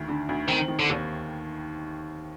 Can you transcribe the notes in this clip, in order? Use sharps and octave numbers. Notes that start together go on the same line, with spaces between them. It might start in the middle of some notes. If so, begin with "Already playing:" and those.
Already playing: D2 D#3
D3
D2
D#3 C4
D#3
D3
D#2